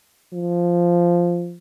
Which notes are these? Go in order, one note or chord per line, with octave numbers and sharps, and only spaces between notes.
F3